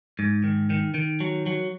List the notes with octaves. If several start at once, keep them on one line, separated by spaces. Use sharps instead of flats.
G#2
D#3
D#3
D#3
F#3
F#3